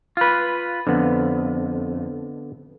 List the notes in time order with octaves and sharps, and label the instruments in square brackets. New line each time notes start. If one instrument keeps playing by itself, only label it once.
[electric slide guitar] F4 B4
[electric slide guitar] F2 [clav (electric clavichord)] D3 B3